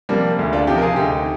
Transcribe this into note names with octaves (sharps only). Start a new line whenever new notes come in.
C3 F3 G3 A#3
D2 G#3
D4 F4
C3 F3 D#4 G4
A#4
F4 G#4
D2 D#4 G4